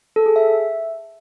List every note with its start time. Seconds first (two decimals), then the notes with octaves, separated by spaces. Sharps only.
0.16 A4
0.26 G#4
0.36 E5